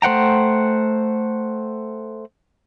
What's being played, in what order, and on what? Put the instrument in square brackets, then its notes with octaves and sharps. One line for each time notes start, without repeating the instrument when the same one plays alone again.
[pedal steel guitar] A3 C5 F#5 G5 A#5